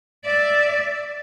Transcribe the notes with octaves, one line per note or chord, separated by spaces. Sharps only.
D5 E5